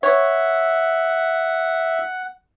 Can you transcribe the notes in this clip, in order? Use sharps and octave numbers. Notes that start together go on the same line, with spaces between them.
C#5 E5 F#5